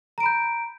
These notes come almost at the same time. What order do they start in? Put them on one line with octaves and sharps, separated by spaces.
A#5 D7 B5 G6